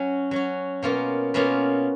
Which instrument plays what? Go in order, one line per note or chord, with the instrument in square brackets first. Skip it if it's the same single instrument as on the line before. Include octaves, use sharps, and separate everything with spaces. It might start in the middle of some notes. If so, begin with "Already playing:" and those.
Already playing: [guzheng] F#3 C#4 F#4
F#3 C#4 F#4
B2 A#3 C#4 F4
B2 A#3 C#4 F4